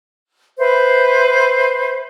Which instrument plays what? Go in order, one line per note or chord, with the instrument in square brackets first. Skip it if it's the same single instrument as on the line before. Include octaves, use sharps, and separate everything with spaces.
[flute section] B4 C5 E5